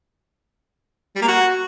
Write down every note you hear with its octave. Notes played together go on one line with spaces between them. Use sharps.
G3
A#3
F#4